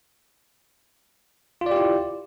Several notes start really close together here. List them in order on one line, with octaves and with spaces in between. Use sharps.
F4 D5 G4 E4